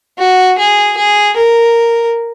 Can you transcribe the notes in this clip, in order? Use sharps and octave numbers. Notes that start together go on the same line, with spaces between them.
F#4
G#4
G#4
A#4